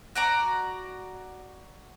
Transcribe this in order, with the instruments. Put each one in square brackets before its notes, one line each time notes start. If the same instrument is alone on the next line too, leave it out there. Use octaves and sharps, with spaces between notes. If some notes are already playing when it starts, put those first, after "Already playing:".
[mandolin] F#4 D5 A#5